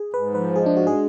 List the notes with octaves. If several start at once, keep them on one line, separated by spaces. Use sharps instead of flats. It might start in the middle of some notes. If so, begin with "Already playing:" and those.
Already playing: G#4
G#2 B4
F3 B4
G#3 G#4
D4
G#2 F#4
G#4